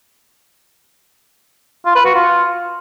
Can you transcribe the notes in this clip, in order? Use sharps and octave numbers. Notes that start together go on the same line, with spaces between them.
F4
B4
F#4
F4